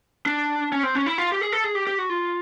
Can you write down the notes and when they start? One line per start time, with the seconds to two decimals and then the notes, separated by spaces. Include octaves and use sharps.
0.26 D4
0.72 C#4
0.83 C4
0.95 C#4
1.06 E4
1.18 F4
1.32 G4
1.41 G#4
1.52 A4
1.64 G#4
1.75 G4
1.87 G4
1.99 F#4
2.10 F4